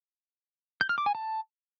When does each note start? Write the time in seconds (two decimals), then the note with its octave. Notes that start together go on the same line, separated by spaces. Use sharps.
0.81 G6
0.89 F6
0.98 D6
1.06 G#5
1.15 A5